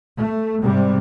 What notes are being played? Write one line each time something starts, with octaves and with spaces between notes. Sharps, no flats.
A3
G#2 C3 G3